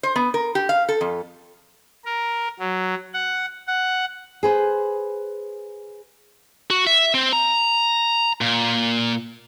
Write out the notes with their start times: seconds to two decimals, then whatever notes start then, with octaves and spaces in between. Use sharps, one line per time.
0.03 C5
0.16 B3
0.34 A#4
0.55 G4
0.69 F5
0.89 A4
1.01 F2
2.05 A#4
2.59 F#3
3.13 F#5
3.67 F#5
4.43 G#4 B4 C5
6.70 F#4
6.87 E5
7.15 C4
7.33 A#5
8.41 A#2